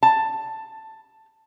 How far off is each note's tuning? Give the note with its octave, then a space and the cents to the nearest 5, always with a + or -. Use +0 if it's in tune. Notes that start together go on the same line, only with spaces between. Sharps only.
A5 +10